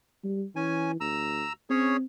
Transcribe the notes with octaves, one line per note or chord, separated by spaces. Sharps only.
G3
E3 C#4 G#5
D2 A#5 E6
C4 C#4 G#4 C#5